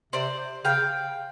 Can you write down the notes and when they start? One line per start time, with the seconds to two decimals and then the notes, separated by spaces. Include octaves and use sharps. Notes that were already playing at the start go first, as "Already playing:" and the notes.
0.13 C3 C5 D5
0.65 C#3 F5 G5